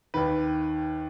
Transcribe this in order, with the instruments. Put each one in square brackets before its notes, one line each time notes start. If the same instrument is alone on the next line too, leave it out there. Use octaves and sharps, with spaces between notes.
[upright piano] D#2 D#3 B4